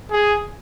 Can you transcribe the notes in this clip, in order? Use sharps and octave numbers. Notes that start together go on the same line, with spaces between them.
G#4